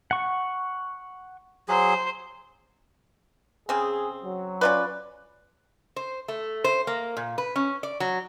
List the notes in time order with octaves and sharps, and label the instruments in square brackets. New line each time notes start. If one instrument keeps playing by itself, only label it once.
[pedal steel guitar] F#5 C#6
[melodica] F#3 G#4 [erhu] C5
[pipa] C#3 C4 [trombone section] G#4
[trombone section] F#3
[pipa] C#4 F4 B4 [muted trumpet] D5
[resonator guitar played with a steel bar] C5
A3
C5
A#3
A#2
B4
C#4
D5
F#3